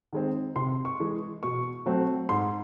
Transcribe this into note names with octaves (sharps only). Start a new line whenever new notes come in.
D#3 G#3 C4
C3 C6
C#6
E3 G#3
B2 C#6
F#3 A3 C4
G#2 C6